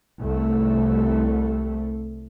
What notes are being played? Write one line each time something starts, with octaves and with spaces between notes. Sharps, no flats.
C2 A3